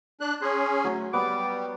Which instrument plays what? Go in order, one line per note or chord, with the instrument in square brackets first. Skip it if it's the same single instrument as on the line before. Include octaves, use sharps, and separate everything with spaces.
[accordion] D4 F#6
[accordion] C#4 G#4 [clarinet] C6
[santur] F#3 [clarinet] A3
[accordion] G3 [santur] B3 [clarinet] D6